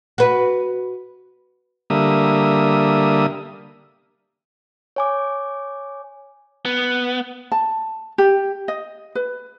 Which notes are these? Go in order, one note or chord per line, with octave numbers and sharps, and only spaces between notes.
F#4 B4
D3 G3 A#3 E5 D#6
C#5 G#5 D6
B3
A5
G4
D#5
B4